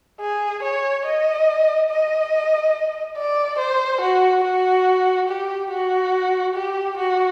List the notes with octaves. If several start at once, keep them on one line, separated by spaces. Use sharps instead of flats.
G#4
C#5
D#5
D#5
D5
C5
F#4
F#4
G4
F#4
G4
F#4